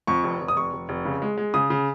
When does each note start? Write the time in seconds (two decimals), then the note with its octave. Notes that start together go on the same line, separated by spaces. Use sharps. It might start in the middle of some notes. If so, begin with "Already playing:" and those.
0.07 F2 C#6
0.24 F1
0.41 F1
0.48 D#6
0.56 F1 C#6
0.73 F1
0.89 F1
1.05 C#3
1.22 G#3
1.37 G#3
1.54 C#3 D#6
1.70 C#3